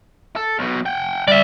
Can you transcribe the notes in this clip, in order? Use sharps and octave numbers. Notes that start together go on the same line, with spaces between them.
A4
B1 B2
F#5 G5
G3 D5 E5